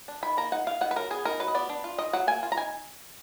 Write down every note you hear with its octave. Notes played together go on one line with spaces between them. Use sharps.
D4
D#3 B5
A#3 A#5
D#4 F#5
D#3 F5
D#3 F#5
B4
F#3 A#4
B3 G#4
D#4 A#4
F#3 B4
D#5
B3 D5
D4
F4
D#3 D#5
F#3 F#5
A#3 G#5
F4
A#5
D#3 G#5